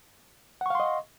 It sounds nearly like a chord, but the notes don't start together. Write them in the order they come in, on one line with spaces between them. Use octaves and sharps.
F#5 C#6 F5 C6 D#5